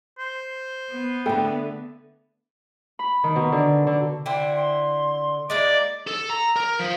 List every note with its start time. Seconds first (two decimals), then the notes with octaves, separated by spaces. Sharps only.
0.18 C5
0.92 B3
1.26 D3 A3 A4 G5 B5
2.99 B5
3.24 D#3
3.35 B2
3.52 D3
3.87 D3
4.26 D3 E4 C5 G5
4.56 C6
5.50 G#3 A#3 E4 D5 D#5
6.07 A4
6.30 A#5
6.56 A#4
6.79 F3